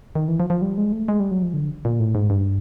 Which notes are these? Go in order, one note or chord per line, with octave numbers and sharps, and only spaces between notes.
D#3
E3
F3
F3
G3
G#3
A3
G#3
G3
F#3
F3
D3
A#2
A2
G#2
G2